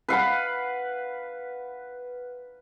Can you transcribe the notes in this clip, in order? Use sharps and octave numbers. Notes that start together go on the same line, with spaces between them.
B4 F5 F#5 B5